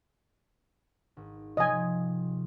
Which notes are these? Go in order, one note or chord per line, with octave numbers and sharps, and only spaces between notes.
G#1
C3 F3 G#3 D#5 G#5